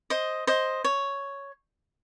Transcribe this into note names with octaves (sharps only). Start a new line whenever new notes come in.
C5 D#5
C5 D#5
C#5